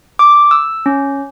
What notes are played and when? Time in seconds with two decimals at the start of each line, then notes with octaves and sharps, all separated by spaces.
0.19 D6
0.51 E6
0.86 C#4